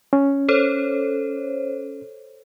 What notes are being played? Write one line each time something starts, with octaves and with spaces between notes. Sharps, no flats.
C#4
A4 C5 C#5